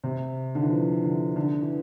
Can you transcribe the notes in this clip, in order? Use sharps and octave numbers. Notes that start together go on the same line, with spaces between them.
C3
D3
E3
F3
D3
D3
E3